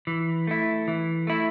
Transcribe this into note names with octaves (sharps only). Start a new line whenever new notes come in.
E3
A3 E4
E3
A3 E4